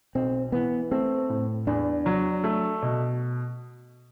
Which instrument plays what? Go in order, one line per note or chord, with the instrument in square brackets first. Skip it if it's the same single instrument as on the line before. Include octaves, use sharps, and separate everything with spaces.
[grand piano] B1 [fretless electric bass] C4
[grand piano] E3 [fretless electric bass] B3
[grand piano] A3 [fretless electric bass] C4
[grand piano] A2
[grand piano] E2 [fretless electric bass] D4
[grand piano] F#3
A3
B2